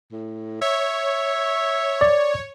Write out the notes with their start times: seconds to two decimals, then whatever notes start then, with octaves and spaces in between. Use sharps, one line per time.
0.12 A2
0.62 C#5 E5
2.01 D5